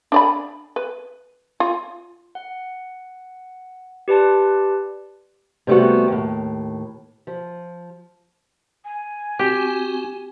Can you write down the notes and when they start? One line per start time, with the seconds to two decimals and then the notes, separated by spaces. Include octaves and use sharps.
0.12 D4 D5 B5
0.76 B4
1.60 F4
2.35 F#5
4.08 G4 B4 D5 A5 C6
5.67 C3 G3 A3 B3 F#4
6.08 D#2 A2
7.27 F3
8.84 G#5
9.39 C4 F#4 G4